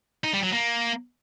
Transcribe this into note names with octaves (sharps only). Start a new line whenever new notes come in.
D#4
G3
F#3
A#3